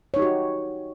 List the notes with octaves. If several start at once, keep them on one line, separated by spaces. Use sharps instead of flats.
D#4 F#4 G4 C#5